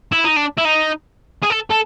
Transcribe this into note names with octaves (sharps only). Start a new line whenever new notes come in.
E4
D#4
D4
E4
D#4
G#4
A4
A4